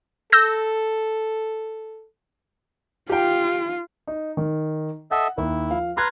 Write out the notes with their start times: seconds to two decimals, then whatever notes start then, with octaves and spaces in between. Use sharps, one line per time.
0.32 A4 E6 G6 A#6
3.09 F4 G4 G5
4.07 D#4
4.37 D#3
5.11 A4 D#5 E5 F#5
5.38 D#2 E4
5.70 F3 F5
5.97 B4 A#5 C6 F6 F#6 G#6